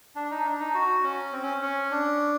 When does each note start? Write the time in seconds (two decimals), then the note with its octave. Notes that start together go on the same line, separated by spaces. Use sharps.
0.16 D4
0.31 D#4
0.45 D4
0.60 D#4
0.75 F#4
1.03 C#4
1.33 C4
1.43 C#4
1.62 C#4
1.91 D4